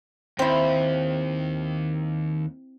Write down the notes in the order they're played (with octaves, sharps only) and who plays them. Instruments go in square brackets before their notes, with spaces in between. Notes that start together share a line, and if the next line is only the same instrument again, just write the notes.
[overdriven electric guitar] D#2 [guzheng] C4 E4